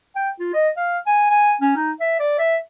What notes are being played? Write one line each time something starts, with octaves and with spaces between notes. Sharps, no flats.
G5
F4
D#5
F5
G#5
G#5
C#4
D#4
E5
D5
E5